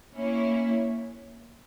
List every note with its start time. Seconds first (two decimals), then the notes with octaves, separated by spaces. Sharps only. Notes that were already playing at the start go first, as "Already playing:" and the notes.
0.14 A#3 C#4 E4